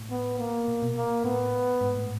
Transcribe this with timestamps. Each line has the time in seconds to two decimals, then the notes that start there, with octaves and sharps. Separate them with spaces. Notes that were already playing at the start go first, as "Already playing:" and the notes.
Already playing: A2
0.11 B3
0.39 A#3
0.68 A#2
0.82 B2
0.96 A#3
1.24 A2 B3
1.81 G#2
1.95 A2